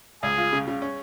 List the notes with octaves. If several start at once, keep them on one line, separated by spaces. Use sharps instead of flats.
C#2 G#4
F4
C#3
C#3
C#4